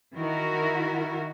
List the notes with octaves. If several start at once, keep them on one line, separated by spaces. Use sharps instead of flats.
D#3 E4 F#4 A#4